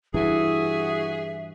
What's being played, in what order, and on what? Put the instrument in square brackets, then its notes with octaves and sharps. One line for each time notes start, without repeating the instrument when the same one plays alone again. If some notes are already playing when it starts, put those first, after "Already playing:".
[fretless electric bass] G2 E3 [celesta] E4 [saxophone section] F#4 G#4 [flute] E5